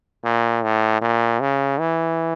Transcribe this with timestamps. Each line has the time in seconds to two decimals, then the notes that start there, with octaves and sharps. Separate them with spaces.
0.24 A#2
0.64 A2
1.01 A#2
1.40 C#3
1.78 E3